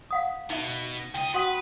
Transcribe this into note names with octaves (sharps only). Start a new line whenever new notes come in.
F5 F#5 D#6
B2 D#4 E5
C#2 D#5 G5
F#4 B4 F#5 D#6